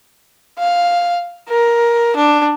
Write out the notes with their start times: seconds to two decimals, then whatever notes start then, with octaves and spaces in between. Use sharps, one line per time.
0.59 F5
1.49 A#4
2.16 D4